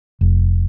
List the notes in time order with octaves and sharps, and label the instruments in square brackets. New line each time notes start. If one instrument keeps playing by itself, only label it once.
[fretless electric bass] F1